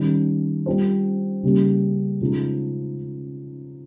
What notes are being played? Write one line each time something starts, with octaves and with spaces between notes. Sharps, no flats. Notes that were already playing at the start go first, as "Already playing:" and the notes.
Already playing: D#3 G3 C#4
G3 C4 F4 C5
C#3 G3 A#3
C#3 F3 G#3 D#4